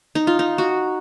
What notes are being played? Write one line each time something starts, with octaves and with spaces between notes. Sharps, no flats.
D#4
F4
D#4
F#4